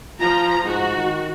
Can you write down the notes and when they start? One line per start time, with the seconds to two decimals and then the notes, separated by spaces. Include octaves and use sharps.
0.20 F3 F4 A#5
0.64 G#2 F#4
0.96 D#3